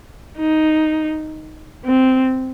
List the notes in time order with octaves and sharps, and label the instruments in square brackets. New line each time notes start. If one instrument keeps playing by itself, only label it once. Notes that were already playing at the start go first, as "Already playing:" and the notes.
[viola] D#4
C4